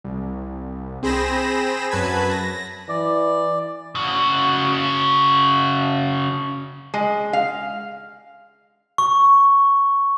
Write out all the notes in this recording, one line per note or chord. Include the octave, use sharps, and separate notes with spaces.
C2
C4 G#4 C5 B5 A#6 E7
F#2 F#3 B4 A5 B5 G#6
A#6
E3 D5
C#3 F#4
G#3
F5
C#6